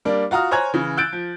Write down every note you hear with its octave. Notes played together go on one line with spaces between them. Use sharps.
G3 A#3 D4
F4 F#4 A#5 D#6 F6
C5 C#5 G#5 A#5 F#6 G#6
C#3 E3
E6 F#6 G6 A6 D7
F3